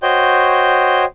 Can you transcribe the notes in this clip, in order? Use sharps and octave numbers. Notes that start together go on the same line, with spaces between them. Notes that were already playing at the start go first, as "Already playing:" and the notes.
F#4 C5 C#5 D#5 G5 G6